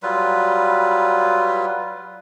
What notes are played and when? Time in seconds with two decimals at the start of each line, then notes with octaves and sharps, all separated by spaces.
0.03 F#3 G3 F4 B4